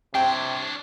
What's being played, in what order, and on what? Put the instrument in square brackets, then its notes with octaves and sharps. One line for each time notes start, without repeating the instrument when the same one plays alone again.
[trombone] C3 [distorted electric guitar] D4 C#5 [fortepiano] G5